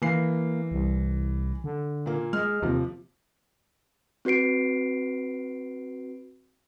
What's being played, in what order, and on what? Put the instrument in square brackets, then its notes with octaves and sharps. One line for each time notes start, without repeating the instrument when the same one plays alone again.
[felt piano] E3 C7 [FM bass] A#3
[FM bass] C2
D3
[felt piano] A#2 A#3
[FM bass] G#3 [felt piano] F6
[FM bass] D#2 [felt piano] C3 F3
[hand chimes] C4 F#4 B4 C7 D7